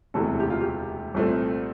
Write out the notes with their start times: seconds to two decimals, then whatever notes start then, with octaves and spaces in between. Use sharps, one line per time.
0.14 E1 D2 C3 E3 A4
0.40 G4
0.50 F4
0.61 G4
1.15 C2 A#2 A3 C4